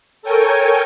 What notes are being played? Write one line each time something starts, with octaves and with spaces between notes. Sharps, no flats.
A4 A#4 C#5 G5 G#5